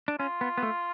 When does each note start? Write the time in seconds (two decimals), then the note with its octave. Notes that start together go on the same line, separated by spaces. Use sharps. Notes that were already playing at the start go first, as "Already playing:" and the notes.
0.08 D4
0.20 C#4 F4
0.41 B3
0.58 B3
0.63 A3